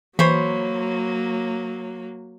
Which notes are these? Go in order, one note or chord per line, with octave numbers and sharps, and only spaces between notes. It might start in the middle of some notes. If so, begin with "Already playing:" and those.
E3 F#3 A#3 C5 C#5 B5